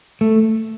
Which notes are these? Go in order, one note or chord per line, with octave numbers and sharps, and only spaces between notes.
A3